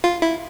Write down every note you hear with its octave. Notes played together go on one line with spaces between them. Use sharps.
F4
E4